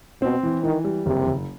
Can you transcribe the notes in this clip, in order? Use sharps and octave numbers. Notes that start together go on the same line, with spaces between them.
B2 C4
E3
D#3 E3
G3
F#1 C3
F#1